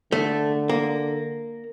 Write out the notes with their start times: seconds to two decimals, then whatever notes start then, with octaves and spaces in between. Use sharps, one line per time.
0.12 D3 A3
0.69 A#3